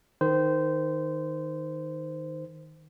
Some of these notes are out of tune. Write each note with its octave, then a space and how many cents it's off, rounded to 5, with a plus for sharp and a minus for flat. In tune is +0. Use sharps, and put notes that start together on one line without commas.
D#3 +0 C5 -20